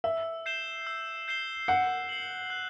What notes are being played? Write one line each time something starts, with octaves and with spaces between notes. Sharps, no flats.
E5 E6
G6 C7 E7 G7
E6
G6 C7 E7 G7
F#5 F#6
C7 F#7
F#6